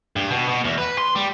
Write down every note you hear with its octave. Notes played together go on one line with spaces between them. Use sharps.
G2
B2
B2
E2
B4
C6
G3